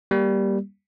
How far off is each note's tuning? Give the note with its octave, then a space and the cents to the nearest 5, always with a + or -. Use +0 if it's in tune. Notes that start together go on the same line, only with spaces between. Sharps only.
G3 +0 A#3 +15